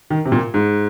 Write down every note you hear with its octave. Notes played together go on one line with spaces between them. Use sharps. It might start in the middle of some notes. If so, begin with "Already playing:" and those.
D#3
C3
A#2
G#2